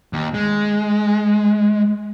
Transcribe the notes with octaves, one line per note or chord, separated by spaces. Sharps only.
D#2
G#3